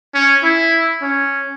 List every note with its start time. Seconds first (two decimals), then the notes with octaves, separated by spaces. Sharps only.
0.14 C#4
0.43 E4
1.02 C#4